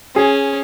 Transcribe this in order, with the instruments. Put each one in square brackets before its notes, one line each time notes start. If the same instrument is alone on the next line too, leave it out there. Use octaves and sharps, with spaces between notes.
[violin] C#4 [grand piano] G#4